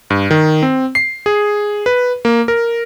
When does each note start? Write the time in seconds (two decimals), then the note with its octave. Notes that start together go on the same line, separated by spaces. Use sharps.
0.10 G2
0.31 D#3
0.63 C4
0.95 C7
1.26 G#4
1.86 B4
2.25 A#3
2.48 A#4